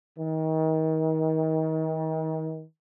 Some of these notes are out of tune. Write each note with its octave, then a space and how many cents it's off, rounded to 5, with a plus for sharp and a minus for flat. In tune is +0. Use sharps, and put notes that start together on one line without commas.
D#3 +35